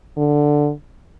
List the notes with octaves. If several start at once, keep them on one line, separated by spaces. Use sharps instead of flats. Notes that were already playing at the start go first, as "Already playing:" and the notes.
D3